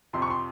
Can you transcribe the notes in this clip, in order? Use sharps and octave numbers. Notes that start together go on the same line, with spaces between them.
F2 C3 F3 C6
C#6
C6